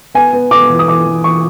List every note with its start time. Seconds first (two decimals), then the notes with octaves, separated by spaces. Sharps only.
0.14 B3 G#5
0.33 B3
0.51 B3 D6
0.70 E3
0.79 D#6
0.88 E3 D6
1.06 E3
1.24 E3 C#6